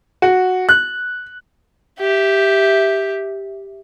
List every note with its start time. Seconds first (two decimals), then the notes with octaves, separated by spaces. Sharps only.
0.22 F#4
0.69 F#6
2.00 G4 E5